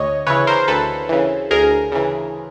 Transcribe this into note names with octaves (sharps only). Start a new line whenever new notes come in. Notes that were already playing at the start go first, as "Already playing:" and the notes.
Already playing: D2 C#5 D#5
C#3 E3 B4 C#5
A#4 C5
D2 A4 B4
C#3 E3
D2 G#4 A#4
C#3 E3